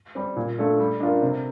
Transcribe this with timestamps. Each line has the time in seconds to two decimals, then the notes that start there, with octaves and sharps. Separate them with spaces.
0.15 G3 C4
0.36 A#2
0.58 A3 D4 F4 A4
0.79 G3
1.00 D4 F4 A#4
1.22 C3